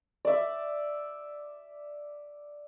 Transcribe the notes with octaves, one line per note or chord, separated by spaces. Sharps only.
D5 E5